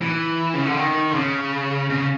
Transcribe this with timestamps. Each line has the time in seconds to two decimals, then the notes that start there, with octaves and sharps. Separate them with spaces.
0.01 E3
0.54 C#3
0.65 D3
0.77 D#3
1.11 D3
1.15 C#3
1.90 C#3